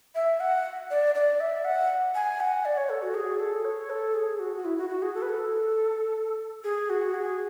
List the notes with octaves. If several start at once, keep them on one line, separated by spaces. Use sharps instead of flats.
E5
F#5
D5
D5
E5
F#5
G#5
F#5
D5
C#5
A4
F#4
G#4
A4
C#5
A4
G#4
F#4
F#4
E4
F#4
F#4
G#4
A4
B4
A4
G#4
F#4
G#4